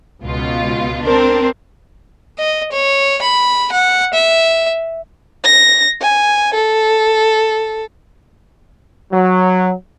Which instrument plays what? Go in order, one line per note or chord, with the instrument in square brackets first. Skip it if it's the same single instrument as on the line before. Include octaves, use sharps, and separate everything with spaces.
[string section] C#2 B2 F4
[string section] C4 D4 [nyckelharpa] A#4 C5
[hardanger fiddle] D#5
C#5
B5
F#5
E5
[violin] A#6
G#5
A4
[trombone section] F#3